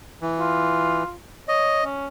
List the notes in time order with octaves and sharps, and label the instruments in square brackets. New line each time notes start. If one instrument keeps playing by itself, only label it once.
[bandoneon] E3
[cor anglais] F4
[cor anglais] C#5 [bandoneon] D#5
[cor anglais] C#4